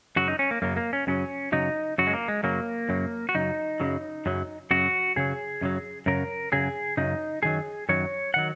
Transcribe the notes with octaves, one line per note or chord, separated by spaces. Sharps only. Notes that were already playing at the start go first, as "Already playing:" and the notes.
F#2 C#3 F#3 F#4
D#4
C#4
A#3
F#2 C#3 F#3 A#3
A#3
C#4
F#2 C#3 F#3 C#4
F#2 C#3 F#3 D#4
F#2 C#3 F#3 F#4
G#3
A#3
G#3
F#2 C#3 F#3 A#3
F#2 C#3 F#3
F#4
F#2 C#3 F#3 D#4
F#2 C#3 F#3
F#2 C#3 F#3
F#2 C#3 F#3 F#4
F#2 C#3 F#3 G#4
F#2 C#3 F#3
F#2 C#3 F#3 A#4
F#2 C#3 F#3 G#4
F#2 C#3 F#3 D#4
F#2 D#3 F#3 G#4
F#2 D#3 F#3 C#5
D#3 F#3 F#5